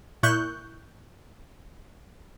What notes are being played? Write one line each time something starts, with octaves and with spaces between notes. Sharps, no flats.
A#2 E4 C#6 F#6 G6